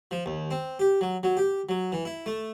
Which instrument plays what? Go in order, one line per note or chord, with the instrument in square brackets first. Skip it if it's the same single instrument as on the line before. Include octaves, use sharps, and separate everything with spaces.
[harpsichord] F3
D#2
C4
G4
F#3
F#3
G4
F#3
E3
E4
A3